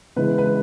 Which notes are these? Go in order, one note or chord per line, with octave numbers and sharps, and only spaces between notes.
C#3 E3 G#3 B4
B4